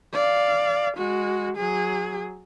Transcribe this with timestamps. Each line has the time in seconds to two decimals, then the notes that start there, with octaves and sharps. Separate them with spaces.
0.14 D5 F5
0.97 G#3 F#4
1.57 F#3 G#4